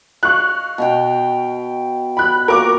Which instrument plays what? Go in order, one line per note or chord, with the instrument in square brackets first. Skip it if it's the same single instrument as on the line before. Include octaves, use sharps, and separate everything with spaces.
[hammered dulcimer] D#5 F5 [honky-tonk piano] C#6 F#6
[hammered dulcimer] B2 F5 G5
[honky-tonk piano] B5 F#6
[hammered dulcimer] A#2 F#4 [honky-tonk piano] A#4 D6